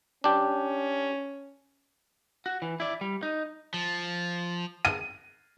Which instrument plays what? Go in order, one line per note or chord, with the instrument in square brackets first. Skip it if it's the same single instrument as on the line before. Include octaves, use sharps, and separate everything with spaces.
[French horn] C#4 [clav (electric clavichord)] D4 G4
[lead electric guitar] F#4
E3
E4 D5
G3
D#4
[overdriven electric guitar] F3
[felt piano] D#7